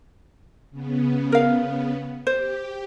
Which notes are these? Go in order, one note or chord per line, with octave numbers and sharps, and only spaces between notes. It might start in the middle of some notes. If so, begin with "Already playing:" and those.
C#3 B3
A#4 F5
G4 C5